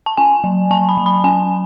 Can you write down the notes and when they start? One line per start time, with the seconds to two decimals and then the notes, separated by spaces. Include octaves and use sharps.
0.06 A5
0.17 C#4 G#5
0.44 F#3
0.71 F#3 A5
0.89 B5
0.97 F#3
1.06 B5
1.24 C#4 G#5